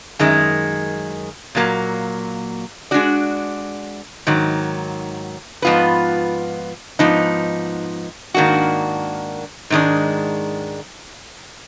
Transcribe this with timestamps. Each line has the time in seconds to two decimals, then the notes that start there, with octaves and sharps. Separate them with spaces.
0.19 F#2 D#3 G#3
1.55 A#2 F#3 A#3
2.91 G#3 D4 F#4 D5
4.27 G#2 D#3 F#3
5.62 G#2 F3 B3 F4 B4
6.99 G#2 F3 B3 D#4
8.34 G#2 D#3 A#3 D4 F#4
9.70 G#2 D#3 G#3 D4